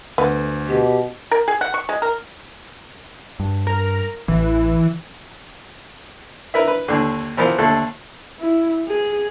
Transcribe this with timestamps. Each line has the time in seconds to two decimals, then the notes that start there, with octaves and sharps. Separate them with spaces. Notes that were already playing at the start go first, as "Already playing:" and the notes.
0.18 D2 B3
0.68 B2 G4
1.31 A#4
1.48 G#4
1.61 F#5
1.74 C#6
1.89 G#3
2.02 A#4
3.40 G2
3.67 A#4
4.28 A1 E3
6.54 A#4 B4 E5
6.67 B4
6.88 D#2 D3
7.37 E3 F3 B3 A#4
7.58 D#2 D3 A3 A4
8.40 E4
8.87 G#4